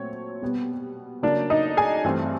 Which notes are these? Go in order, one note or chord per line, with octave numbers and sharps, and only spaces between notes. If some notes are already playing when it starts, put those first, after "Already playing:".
Already playing: A#2 F#3 A3 C4 C#5
B2 G3 B3
C#3 F#3 A#3 D4 D5
D#4 D#5
G#4 G#5
G2 E3 A3 C4